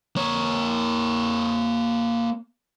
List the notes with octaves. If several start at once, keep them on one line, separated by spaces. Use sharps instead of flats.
A#3 C#5